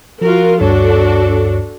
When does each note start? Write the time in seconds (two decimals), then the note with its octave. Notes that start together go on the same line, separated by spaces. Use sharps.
0.21 F3 F4 F#4 A#4
0.61 D2 G2 D4 F#4 A4 C#5